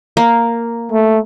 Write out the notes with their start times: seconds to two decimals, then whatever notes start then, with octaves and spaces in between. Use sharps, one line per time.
0.17 A#3
0.92 A3